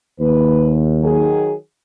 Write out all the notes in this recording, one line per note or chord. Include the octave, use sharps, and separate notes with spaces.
D#2 B4
D#3 F#3 G#4